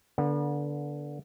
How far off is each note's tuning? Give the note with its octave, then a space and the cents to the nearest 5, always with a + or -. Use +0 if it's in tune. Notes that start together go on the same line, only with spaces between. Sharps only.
D3 -15 B3 -35